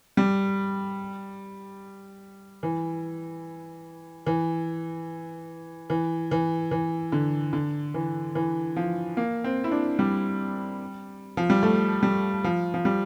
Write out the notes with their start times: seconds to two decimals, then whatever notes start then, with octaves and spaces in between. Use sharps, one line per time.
0.17 G3
2.63 E3
4.27 E3
5.90 E3
6.31 E3
6.71 E3
7.12 D3
7.53 D3
7.94 E3
8.35 E3
8.76 F3
9.17 A#3
9.44 C4
9.64 E4
9.71 D4
9.99 G3
11.37 F3
11.50 G3
11.63 A3
12.03 G3
12.44 F3
12.74 F3
12.85 G3